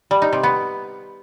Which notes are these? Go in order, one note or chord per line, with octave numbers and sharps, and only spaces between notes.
G3
D#4
C3
B3